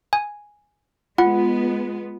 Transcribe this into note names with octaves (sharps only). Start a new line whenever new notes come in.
G#5
G#3 B3 F4 F#5